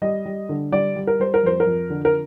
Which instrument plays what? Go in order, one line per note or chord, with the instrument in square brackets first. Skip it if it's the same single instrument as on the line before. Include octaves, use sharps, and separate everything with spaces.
[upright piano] G3 D#5
G3
D3
G3 D5
G3
A#4
G3 C5
A#4
F2 C5
A#4
F2
D3
A#4